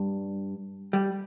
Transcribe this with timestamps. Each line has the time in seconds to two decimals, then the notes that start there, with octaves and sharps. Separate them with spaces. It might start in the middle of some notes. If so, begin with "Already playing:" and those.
Already playing: G2
0.93 G3